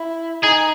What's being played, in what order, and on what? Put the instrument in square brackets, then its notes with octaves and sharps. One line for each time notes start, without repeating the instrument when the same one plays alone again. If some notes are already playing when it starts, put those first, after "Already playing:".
Already playing: [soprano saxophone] E4
[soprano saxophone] D#4 [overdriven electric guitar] G#4